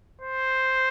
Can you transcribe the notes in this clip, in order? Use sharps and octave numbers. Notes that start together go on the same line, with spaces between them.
C5